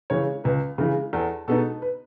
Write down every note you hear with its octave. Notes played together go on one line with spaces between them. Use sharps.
C#3 E3 G#3 C#5
C#2 B4
C#3 E3 G#3
E2 A4
B2 G#3 B3 D#4 A4
B4